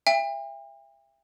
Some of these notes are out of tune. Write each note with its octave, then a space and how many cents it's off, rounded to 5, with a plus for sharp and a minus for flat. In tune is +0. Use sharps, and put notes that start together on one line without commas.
E5 +25 G5 +40